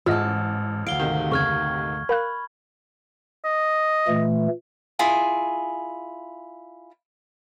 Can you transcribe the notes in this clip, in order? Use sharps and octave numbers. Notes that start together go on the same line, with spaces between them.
A1 G#2 F4 D#5 E5 A5 E6 F6
D2 F5 D7 G7
G#2 C3 D#3
F2 C#3 C#6 F6 G#6
A#4 F5 B5 F#6
D#5
A#2 E3 A3
E4 F4 G#4 G#5